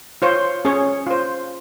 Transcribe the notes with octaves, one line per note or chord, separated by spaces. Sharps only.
F4 C5 C#5
C#4 G#4 C#5
F4 C5